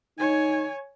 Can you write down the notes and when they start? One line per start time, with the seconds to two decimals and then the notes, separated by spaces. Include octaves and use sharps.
0.19 D#4 C#5 G#5